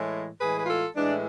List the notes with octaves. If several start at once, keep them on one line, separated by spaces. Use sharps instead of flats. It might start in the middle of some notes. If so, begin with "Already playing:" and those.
Already playing: A2 E3 G#3
A2 E3 G#3 G#4 B4
B4
F4 A4
A2 E3 G#3 D4